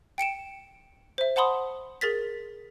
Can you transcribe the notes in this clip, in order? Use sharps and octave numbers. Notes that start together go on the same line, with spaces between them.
G5 C#7 D7 E7
C5 E5
C5 F#5 A5 B5 C6 D#6
G#4 A#4 A6 B6